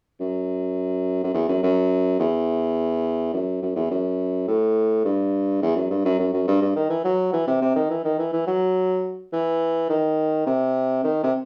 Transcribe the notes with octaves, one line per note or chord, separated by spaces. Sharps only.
F#2
F#2
E2
F#2
F#2
E2
F#2
F#2
E2
F#2
A2
G2
E2
F#2
G2
F#2
F#2
F#2
G2
G2
D#3
E3
F#3
E3
C3
C3
D#3
E3
D#3
E3
E3
F#3
E3
D#3
C3
D#3
C3